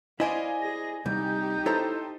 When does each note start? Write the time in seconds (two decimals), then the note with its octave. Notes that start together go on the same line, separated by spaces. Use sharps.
0.20 E4 C5 D5 D#5 F5 G#5
0.61 G#4 A#6
1.06 C2 G3 D#4 G4 G6
1.66 E4 A4 C5 C#5 A#5 A6